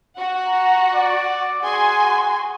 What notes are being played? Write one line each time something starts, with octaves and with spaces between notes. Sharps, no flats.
F#4 F#5
A#5
D5
F#4 G#4 G#5 C6